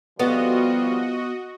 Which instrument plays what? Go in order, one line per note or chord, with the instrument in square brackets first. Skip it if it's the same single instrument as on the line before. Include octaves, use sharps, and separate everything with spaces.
[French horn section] F3 G3 F4 [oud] B3 [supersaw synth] F#4 D#5